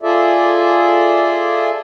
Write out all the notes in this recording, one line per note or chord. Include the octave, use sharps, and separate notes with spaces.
F4 G#4 A4 D5 E5